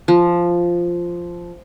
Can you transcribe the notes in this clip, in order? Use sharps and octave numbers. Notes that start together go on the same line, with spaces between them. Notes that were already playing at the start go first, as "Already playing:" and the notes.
F3